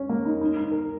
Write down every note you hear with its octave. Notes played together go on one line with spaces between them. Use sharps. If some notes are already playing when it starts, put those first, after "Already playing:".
Already playing: C#4
A#3
D#4
D#4
D#4
A#4